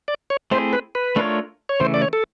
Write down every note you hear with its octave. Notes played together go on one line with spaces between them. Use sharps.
D5
C#5
A3 C4 E4 G#4 C5
B4
B4
A3 D4 F4 A#4 C#5
C#5
C#3 E3 A3 C5
D5
C#5
A4